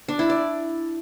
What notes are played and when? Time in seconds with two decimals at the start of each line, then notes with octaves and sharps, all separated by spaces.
0.08 D4
0.19 E4
0.30 D5